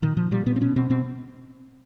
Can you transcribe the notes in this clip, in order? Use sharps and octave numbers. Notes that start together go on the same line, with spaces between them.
A#2 D#3
A#2 F3
A#2 G3
A#2 B3
C4
B2 C#4
B2 C4
B2 C4